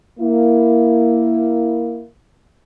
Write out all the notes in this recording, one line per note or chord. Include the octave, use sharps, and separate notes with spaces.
A#3 E4